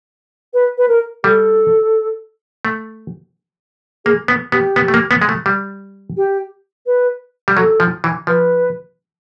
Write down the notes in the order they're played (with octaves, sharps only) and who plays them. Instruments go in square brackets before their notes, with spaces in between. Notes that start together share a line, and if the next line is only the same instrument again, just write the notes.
[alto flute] B4
B4
A#4
[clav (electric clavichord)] G3 [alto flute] A4
[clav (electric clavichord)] A3
[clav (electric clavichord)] A#3 [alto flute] G#4
[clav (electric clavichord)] B3
[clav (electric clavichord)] B3 [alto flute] G4
[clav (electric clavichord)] B3
A3
A#3
B3
G#3
A3
G3
[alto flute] G4
B4
[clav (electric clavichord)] G3
[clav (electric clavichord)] F#3 [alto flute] A4
[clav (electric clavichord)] F3
E3
[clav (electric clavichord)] F3 [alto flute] B4